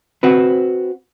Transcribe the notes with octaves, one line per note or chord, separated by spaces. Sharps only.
C4 F#4 B4